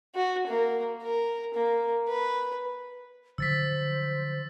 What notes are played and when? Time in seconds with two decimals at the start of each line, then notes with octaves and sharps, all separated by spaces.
0.15 F#4
0.47 A#3
1.02 A#4
1.54 A#3
2.08 B4
3.38 D3 F3 F#3 C5 E6 A6 B6